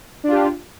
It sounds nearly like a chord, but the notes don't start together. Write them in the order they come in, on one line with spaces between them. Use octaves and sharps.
D4 F4 G4